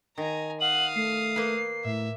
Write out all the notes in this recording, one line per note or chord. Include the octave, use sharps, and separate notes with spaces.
D#3 G#5 A#5
F5 F#5 D#6 F#7
A3 C7
A#3 B4
A2 E5